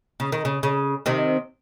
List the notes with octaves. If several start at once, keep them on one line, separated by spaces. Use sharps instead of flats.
C#3
D#3
C#3
C#3
C3 D#3